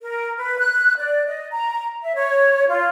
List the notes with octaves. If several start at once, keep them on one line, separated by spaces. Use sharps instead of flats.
A#4
B4
F#6
D5
D#5
A#5
E5
C#5
F4